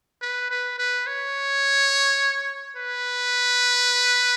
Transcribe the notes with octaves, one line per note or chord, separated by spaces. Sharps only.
B4
B4
B4
C#5
B4